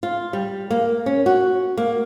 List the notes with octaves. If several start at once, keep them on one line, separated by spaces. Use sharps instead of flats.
F4
G3
A#3
C#4
F#4
A#3